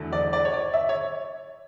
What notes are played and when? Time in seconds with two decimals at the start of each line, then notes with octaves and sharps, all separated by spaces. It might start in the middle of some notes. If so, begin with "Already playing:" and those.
Already playing: E2 D3 F#3 A3
0.13 D5
0.33 D5
0.45 C#5
0.53 D5
0.74 E5
0.89 C#5